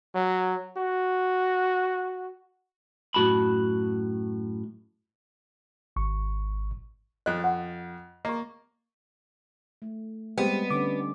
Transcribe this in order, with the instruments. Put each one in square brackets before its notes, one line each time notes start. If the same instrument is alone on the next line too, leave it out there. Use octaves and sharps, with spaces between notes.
[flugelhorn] F#3
F#4
[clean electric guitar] F#2 A2 F#4 A5 B5
[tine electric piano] G#1 C#6
[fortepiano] F2 F#6 [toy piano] D#5
[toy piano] F#5
[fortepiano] A#3 [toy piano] D#5 C#6
[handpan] A3
[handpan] G3 C4 D#5 [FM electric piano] G#3 G4 C5 [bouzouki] B3
[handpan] D3 C#4 [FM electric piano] D6